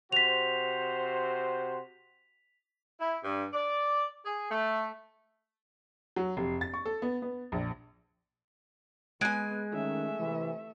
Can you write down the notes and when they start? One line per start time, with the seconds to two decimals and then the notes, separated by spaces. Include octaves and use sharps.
0.12 C3 F#4 C5 B6 F7
3.00 E4
3.24 G2
3.53 D5
4.25 G#4
4.51 A3
6.16 F#3
6.37 F1
6.61 A6
6.74 C#6
6.86 A4
7.02 B3
7.22 B3
7.52 A#1
9.21 G#3 B3 G#5 F#6 G#6 D7
9.73 D#3 A3 C#4 E5
10.19 C3 E3